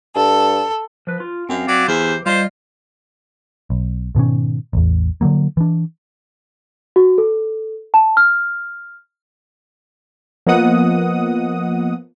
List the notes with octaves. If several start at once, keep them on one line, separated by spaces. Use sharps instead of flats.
G2 A4
F3 B4
F4
F#2 C4 F5
F#3 D5
E2 E3 G4 C5
G3 F4 C5 D#5
B1
G#2 B2 D#3 C#4
A1 E2
D3 D#3 F#3 A#3
E3 D4
F#4
A4
A5
F6
F3 A#3 B3 D#5 F#5 D#6